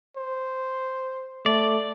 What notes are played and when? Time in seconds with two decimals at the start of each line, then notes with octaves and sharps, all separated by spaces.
0.17 C5
1.46 A3 D5